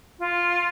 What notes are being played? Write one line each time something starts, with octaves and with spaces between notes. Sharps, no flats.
F4